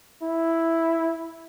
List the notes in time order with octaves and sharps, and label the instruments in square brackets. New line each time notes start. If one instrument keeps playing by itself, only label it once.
[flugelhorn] E4